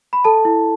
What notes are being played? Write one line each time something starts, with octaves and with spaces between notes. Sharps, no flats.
B5
A4 A5
E4